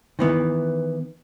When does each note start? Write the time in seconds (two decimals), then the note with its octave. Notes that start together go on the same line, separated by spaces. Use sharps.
0.19 D#3 E3 B3